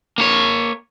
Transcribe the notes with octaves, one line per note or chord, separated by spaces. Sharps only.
A#3 C#5